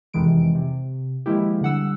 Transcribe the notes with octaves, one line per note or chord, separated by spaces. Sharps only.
F2 C3 D#3 E3 G#3 D7
C3
D#3 F3 G#3 A#3 E4 G4
D3 G3 F#5 E6